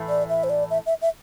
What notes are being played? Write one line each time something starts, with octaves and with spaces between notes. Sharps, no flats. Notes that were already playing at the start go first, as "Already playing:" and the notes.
Already playing: A2 E3 A3 E4
D5
E5
C5
D5
E5
E5
E5